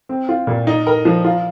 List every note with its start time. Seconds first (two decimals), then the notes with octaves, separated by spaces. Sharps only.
0.09 C4
0.29 F4
0.47 A#2
0.67 D#4
0.87 A#4
1.05 F3
1.24 F4